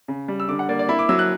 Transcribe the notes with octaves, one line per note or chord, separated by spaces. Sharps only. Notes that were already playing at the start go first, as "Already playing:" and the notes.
C#3
G3
E6
D3 D6
F#5
A#3 D5
D5
E4 B5
D6
F#3 E6
F#6